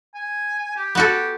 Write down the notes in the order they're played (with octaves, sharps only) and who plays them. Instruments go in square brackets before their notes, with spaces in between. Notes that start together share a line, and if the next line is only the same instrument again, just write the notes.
[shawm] G#5
G4
[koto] B3 F#4 A4 [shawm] G4